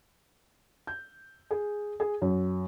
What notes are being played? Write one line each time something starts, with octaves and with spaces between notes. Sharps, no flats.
G6
G#4
G#4
F#2